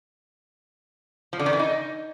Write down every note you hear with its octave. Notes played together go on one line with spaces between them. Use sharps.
F3
D3
D#3
E3
D#4